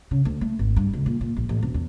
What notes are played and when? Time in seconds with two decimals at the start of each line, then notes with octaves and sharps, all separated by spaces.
0.11 C#3
0.25 D2
0.41 A3
0.59 G#1
0.76 G2
0.94 C#2
1.06 A#2
1.21 A#2
1.37 A#1
1.49 A1
1.63 E1
1.74 E2